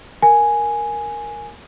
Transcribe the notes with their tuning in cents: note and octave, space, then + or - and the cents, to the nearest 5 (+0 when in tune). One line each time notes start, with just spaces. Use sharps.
A#4 +0 G#5 +0